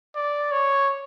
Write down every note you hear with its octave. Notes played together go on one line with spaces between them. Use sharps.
D5
C#5